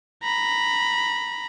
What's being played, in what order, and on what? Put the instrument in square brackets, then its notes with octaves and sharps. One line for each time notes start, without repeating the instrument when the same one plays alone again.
[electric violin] A#5 B5